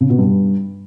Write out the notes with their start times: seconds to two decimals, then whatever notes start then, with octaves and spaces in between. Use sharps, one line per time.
0.01 C#3
0.10 B2
0.19 G2